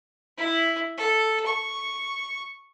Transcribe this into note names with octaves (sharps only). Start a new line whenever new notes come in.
E4
A4
C#6